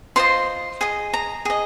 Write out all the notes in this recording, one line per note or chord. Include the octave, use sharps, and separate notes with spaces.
F4 C5 D#5 C6
G#4 D#5
A#5
G#4 D#5